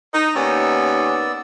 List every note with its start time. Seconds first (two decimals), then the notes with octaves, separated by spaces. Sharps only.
0.14 D#4
0.35 D#2 B3 C#4 D5 E6